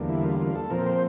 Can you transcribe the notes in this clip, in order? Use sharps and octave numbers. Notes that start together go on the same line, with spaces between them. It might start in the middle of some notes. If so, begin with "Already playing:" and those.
Already playing: E2 D3 G3 A#3
E4
F4
F4
A4
A#2 F3 C4 A#4
C5